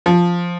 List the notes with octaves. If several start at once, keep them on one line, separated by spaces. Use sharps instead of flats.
F3